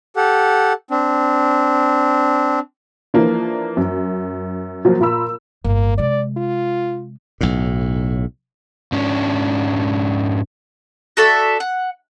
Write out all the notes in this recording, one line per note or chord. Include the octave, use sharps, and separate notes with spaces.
G4 A4 F#5
C4 D4
E3 F3 A#3 D4
F#2
F3 F#3 A#3
A#2 F4 A#4 B5 E6
G1 A2 A#3
C3 G#3 D5
F4
B1 A2
G#2 C#4 D4
F#4 A4 D5 E5
F#5